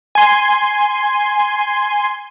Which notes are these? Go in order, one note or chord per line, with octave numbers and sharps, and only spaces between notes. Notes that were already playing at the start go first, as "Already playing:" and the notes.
G#5 C6